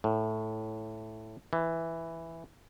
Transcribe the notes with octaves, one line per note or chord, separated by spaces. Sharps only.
A2
E3